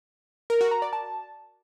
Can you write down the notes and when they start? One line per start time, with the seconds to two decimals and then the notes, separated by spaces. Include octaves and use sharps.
0.50 A#4
0.61 F#4
0.71 A#5
0.82 D5
0.93 A5